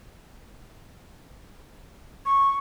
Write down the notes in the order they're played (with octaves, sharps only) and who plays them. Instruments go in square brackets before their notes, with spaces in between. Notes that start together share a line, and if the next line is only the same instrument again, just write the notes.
[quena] C#6